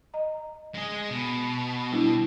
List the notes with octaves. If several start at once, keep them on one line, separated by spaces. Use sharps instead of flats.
D#5 A#5
G#3 G#4
B2
G3 D4 E4